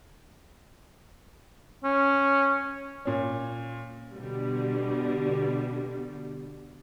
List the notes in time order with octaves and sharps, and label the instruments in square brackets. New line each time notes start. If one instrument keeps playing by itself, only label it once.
[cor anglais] C#4
[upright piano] A#2 C#4
[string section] B2 D3 G3